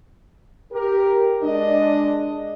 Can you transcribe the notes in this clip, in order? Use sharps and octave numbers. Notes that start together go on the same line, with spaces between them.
G4 A#4
G#3 D4 D#5